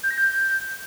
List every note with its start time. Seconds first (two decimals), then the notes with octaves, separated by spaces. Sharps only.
0.03 G6
0.11 A#6
0.18 G6